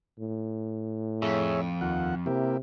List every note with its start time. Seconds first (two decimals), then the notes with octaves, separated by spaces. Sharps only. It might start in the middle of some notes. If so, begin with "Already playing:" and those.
0.20 A2
1.22 F2 G#4 C#5 E5
1.81 D#2 F4 F#5
2.26 C3 A#3 E4 G4